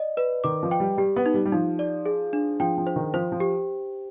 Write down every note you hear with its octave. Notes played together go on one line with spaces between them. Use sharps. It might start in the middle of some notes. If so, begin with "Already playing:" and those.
Already playing: D5 D#5
B4
D#3 D6
F3
G5
G3
G3 G4
B3
D#4
G3
G3
F3 D#4
D5
G#4
D4
F3 G5
F3
C5
D#3
F3 C5
F3
G4